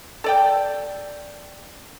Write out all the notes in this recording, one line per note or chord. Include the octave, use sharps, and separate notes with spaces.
A4 D5 G5